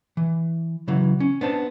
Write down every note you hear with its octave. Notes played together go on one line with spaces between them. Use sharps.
E3
C#3 E3 F#3
C#4
B3 D4 C5 A5